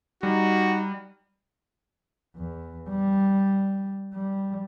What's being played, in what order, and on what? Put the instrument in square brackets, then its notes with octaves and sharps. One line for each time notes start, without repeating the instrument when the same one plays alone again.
[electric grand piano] G3 [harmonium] D#4 [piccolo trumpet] F#4
[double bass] E2
G3
G3